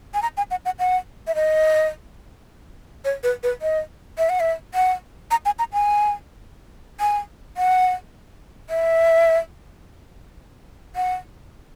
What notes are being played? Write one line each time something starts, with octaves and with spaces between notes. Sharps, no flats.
G#5
A#5
G#5
F#5
F#5
F#5
E5
D#5
C#5
B4
B4
D#5
E5
F#5
E5
F#5
A#5
G#5
A#5
G#5
G#5
F#5
E5
F#5